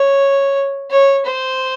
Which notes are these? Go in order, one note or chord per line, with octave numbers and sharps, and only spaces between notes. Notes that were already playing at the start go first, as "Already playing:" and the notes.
Already playing: C#5
C#5
C5